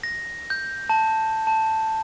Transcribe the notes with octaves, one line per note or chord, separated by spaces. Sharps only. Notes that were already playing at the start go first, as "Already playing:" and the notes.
A#6
G6
A5
A5